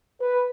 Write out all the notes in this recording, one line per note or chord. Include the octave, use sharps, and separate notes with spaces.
B4